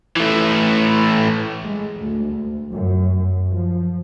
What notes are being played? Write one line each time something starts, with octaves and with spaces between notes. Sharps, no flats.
E3 A3
G#3
D2
F#2
F3